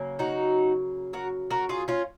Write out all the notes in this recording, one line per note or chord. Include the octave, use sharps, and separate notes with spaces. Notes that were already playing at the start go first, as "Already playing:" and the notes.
Already playing: C#3 F#3 A#3
D#4 F#4
F#4 A#4
F#4 A#4
F4 G#4
C#4 F4